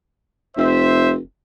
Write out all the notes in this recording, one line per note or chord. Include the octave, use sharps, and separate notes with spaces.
F1 C5 E5